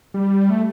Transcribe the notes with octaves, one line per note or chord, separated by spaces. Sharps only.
G3
A3